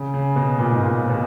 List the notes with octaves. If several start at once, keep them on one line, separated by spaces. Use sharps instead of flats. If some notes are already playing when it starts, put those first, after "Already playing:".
Already playing: C#3
C#3
B2
A#2
G#2
A#2
B2